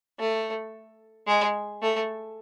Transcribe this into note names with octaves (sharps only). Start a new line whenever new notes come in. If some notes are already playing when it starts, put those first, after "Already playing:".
A3
G#3
A3